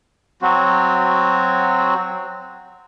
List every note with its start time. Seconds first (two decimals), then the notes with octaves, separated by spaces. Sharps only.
0.42 F#3 C4 F#4